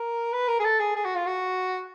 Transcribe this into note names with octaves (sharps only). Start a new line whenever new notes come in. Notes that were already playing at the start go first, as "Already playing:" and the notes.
Already playing: A#4
B4
A#4
G#4
A4
G#4
G#4
F#4
F4
F#4